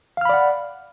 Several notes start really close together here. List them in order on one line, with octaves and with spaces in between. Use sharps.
F5 F6 B5 D5 F#5